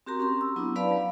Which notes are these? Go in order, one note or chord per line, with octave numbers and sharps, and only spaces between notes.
C4 F#4 G4 A#4 A#5 C6
C#4 A#5 C6
E6
F#3 B3 D4 E4
B4 D5 F5 A5 B5
F#3